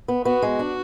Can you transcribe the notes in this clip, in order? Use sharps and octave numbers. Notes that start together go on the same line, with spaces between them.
B3
B3 F#4
G#3
D4